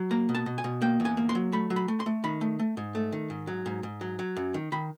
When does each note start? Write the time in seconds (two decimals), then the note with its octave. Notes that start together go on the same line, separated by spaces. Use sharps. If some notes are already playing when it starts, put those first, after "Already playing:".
Already playing: F#3
0.11 A#3 A#5
0.29 B2
0.35 A5
0.46 B2
0.58 G#5
0.64 B2
0.82 A#3 G5
1.00 E2
1.05 G#5
1.17 A#3
1.29 C6
1.35 F#3
1.52 A3 B5
1.70 F#3
1.76 B5
1.88 A3
2.00 C6
2.06 A3
2.24 D#3 B5
2.41 A3
2.59 A3
2.77 G#2
2.95 A3
3.12 D#3
3.30 G#2
3.47 F#3
3.66 G#2
3.83 G#2
4.01 F#3
4.19 F#3
4.37 F#2
4.54 D#3
4.72 D#3 B5